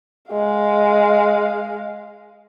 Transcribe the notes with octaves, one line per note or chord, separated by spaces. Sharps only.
G#3 F5